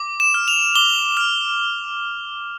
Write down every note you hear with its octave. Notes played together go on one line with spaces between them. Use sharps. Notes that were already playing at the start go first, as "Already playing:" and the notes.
Already playing: D6
E7
F6
F7
D6 G7
F6